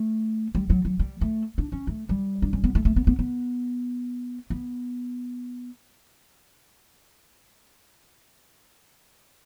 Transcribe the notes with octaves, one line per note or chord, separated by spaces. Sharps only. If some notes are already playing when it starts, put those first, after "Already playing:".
Already playing: A3
G3
F#3
F#3
G3
A3
D4
C#4
A3
G3
D4
C#4
B3
A3
A3
B3
B3
B3
B3